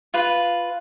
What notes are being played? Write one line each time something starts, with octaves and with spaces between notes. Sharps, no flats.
F4 B4